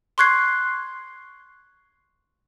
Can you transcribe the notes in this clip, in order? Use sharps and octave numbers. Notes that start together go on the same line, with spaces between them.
C6 C#6 F#6 G#6 C7